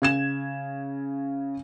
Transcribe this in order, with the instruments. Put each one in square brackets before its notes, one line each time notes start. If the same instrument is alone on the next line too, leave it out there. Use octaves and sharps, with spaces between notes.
[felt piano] C#3 G#6 E7